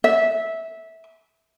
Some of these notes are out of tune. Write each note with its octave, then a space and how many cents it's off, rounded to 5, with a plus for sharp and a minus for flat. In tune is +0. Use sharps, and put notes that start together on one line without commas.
E5 -15